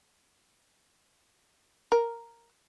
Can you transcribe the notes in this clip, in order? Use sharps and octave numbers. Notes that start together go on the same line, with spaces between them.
A#4